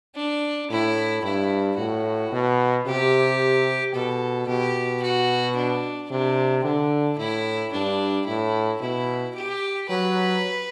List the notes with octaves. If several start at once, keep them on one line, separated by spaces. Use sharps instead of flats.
D4
A2 E4
G2 E4
A2 F#4
B2
C3 G4
B2 A4
B2 G4
F#4
D4
C3 D4
D3 D4
A2 E4
G2 D4
A2 E4
B2 E4
G4
F#3 B4